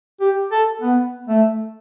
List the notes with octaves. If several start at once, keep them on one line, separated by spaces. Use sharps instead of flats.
G4
A4
B3
A3